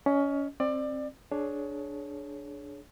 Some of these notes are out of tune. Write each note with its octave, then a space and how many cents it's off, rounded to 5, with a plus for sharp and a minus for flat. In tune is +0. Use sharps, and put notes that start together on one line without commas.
C#4 +20 D#5 -5
C4 +20 D5 +25
D4 +0 G#4 +25 C#5 +0